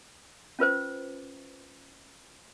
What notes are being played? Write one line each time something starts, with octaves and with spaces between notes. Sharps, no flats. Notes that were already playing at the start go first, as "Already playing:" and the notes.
C#4 F4 B4 C5